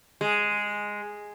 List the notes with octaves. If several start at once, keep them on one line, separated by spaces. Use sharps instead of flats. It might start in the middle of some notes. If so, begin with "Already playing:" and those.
G#3